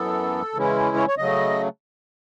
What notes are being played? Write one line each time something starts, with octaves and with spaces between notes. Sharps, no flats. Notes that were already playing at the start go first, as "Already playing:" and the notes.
Already playing: F#2 E3 B3 A4
C#3 E3 G#3 C#4 E4
C#5
C#5
C#3 F#3 A3 D#5